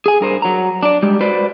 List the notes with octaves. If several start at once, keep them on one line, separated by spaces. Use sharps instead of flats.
G#4 G#5
G2 A#4 C5
F#3 A#5
D4 D5
G3 G#3 G4
F#4 B4 C5 D5